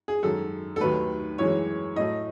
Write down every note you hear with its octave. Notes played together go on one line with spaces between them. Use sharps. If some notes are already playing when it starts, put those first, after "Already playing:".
G#4
F#2 D#3 G#3 A4
A4
D#2 D#3 F#3 A3 B4
F#2 E3 G#3 C#5
A2 F#3 A3 D#5